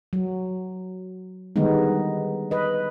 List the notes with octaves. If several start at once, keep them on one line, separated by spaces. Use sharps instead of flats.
F#3
D3 D#3 G3 G#3 B3 D#4
B4 D#5